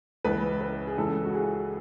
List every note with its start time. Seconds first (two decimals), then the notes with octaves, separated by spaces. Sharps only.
0.25 C#2 C#3 E3 B4
0.61 B4
0.87 G#4
0.97 C#2 C#3 E3 A4
1.25 F#4
1.34 G#4